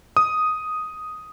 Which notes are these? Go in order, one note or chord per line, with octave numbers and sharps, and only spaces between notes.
D#6